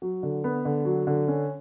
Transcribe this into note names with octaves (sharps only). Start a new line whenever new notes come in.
F#3
D3
B3
D3
F#3
D3
C#4